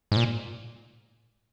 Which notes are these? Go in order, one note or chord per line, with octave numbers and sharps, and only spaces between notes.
G#2
A#2